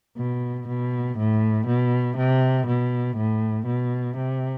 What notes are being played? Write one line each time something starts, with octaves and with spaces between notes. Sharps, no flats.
B2
B2
A2
B2
C3
B2
A2
B2
C3